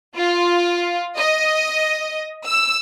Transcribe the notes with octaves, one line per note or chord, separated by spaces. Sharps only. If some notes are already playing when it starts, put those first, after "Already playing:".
F4
D#5
E6